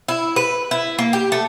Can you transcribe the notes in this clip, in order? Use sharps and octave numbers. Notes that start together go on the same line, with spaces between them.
E4
B4
E4
A#3
G4
A3